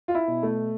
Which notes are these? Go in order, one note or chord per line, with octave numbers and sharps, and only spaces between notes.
F4
E4
B2
A3